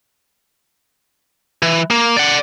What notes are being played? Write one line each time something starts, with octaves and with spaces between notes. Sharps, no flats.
E3
A#3
D5 F#5